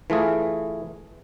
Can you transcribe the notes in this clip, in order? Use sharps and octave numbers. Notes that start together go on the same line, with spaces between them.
E3 A3 F4 G#4